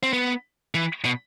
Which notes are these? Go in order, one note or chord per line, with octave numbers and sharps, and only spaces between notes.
C4
B3
E3
B2